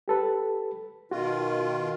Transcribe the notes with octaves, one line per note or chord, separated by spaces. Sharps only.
G4 A4 B4
B2 D#3 F4 F#4